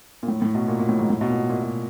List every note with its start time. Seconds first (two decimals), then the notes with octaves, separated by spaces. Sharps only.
0.23 A#2
0.28 A2
0.42 A2
0.55 B2
0.68 A#2
0.79 A#2
0.89 A2
0.99 G#2
1.10 A2
1.21 B2
1.30 A#2
1.49 A#2
1.63 B2